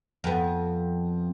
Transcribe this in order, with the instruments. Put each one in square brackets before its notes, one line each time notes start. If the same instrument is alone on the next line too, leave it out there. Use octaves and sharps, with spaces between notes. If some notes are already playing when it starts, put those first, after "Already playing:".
[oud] F2 B3